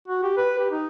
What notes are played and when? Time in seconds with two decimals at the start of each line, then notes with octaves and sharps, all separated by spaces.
0.08 F#4
0.23 G4
0.37 B4
0.59 G4
0.71 D#4